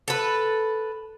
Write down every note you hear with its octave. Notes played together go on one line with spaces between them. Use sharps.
A4 B4